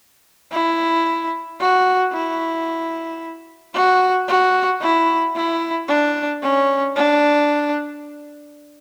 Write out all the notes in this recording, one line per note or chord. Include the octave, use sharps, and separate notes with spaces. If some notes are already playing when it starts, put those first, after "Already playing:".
E4
F#4
E4
F#4
F#4
E4
E4
D4
C#4
D4